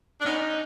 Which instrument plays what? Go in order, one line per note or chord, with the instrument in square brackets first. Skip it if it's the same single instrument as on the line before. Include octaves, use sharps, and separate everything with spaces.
[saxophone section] D4
[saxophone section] B3 C#4 [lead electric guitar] D#4